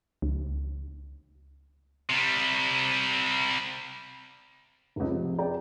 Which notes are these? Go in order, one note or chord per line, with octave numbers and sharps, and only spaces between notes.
C#2
C3 G3
F1 C#2
C3 F3
G#4 D5 G5 A#5